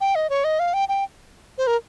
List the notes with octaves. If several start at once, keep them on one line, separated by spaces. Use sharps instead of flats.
G5
D#5
C#5
D#5
F5
G5
G5
C5
A#4